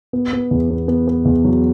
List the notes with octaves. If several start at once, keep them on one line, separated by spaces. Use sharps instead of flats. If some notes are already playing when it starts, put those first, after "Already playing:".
B3
B3
E2
B3
B3
B3
E2
F#3